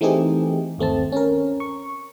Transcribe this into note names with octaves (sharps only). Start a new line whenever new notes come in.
E3 A3 C4 D#4 G4 G#4
G1 D#2 A3 C4 A5
C#4 A#4
C#6